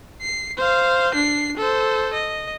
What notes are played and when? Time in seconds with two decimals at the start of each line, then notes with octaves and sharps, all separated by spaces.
0.21 C7
0.57 C5 F5
1.14 D4 C7
1.57 A4 C5
2.13 D#5